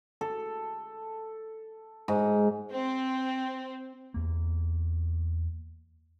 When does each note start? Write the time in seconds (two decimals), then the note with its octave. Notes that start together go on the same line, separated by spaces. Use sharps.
0.21 A4
2.08 G#2
2.72 C4
4.14 E2 A#3